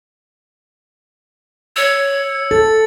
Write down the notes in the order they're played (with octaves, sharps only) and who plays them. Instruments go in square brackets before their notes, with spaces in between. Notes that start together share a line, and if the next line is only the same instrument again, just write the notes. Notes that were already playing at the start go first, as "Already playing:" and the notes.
[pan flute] C#5 [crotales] E6 C#7
[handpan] A4 [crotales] A6